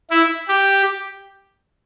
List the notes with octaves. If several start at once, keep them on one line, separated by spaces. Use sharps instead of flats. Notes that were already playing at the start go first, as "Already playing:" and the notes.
E4
G4